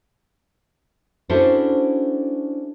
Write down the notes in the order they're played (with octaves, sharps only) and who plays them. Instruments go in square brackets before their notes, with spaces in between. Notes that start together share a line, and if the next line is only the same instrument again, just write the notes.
[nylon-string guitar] C#4 D4 E4 F#4 A4 C5